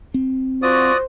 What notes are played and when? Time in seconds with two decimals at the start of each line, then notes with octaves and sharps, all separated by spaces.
0.14 C4
0.63 F3 F4 F#4 C5 D5 D#6